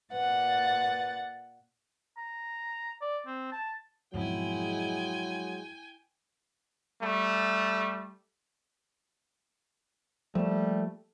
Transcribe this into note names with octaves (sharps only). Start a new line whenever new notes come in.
A#2 B4 F#5 A6
A#5
D5
C4
A5
F2 G#2 B2 F#3 G#3 E4 G5 G#5
G3 A3
F3 G3 A3 A#3